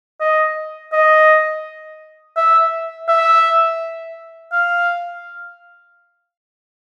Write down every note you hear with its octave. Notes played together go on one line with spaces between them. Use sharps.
D#5
D#5
E5
E5
F5